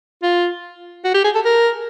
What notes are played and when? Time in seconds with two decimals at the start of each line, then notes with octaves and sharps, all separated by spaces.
0.23 F4
1.04 F#4
1.14 G4
1.24 G#4
1.35 A4
1.45 A#4